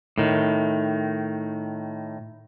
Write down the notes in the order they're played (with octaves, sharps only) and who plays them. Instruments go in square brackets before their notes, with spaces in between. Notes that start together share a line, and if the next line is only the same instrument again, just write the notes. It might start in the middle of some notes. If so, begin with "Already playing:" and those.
[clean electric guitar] A2 D#3